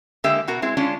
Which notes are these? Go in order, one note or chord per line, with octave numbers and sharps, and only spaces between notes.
D3 G#3 A#3 G4 E5
B2 F#4 A#4
G#3 C4 E4 G#4
G#3 C#4 D4 F4